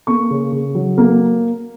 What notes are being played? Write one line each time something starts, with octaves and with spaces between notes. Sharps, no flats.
A#3 C#6
C#3
C#3
F#3
A#3